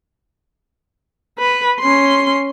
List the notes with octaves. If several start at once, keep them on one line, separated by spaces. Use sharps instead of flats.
B4
C#4 C6